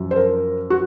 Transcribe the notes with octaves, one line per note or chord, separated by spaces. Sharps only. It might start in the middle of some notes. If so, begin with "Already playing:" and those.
Already playing: F#2 F3
C5
A#4
F#4